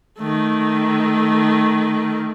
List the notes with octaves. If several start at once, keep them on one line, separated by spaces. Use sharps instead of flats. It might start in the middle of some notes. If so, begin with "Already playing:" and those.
D#3 A3